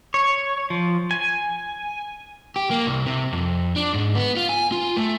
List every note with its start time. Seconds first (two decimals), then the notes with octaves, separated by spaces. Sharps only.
0.14 C#5
0.70 F3
1.11 G#5
2.56 G4
2.70 A#3
2.87 C2
3.06 C3
3.33 F2
3.76 D4
3.94 G#2
4.15 B3
4.37 F4
4.49 G#5
4.72 F4
4.97 A3